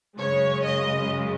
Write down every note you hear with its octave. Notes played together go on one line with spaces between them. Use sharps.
F#2 C#3 G#3 C#5
D#5